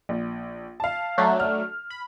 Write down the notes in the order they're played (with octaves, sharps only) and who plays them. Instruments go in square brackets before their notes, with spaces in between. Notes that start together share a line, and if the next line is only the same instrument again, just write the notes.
[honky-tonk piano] A#1
F5 A5
[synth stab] F#3 A3 D4
[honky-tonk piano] F6
[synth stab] B5